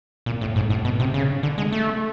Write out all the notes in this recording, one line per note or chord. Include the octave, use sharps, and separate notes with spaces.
A#2
A2
G#2
A2
B2
C3
C#3
D3
G#3
A3